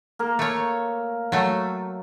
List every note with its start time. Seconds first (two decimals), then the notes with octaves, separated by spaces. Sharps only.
0.19 A#3 A#4
0.39 A3 C#5
1.32 F#3 A3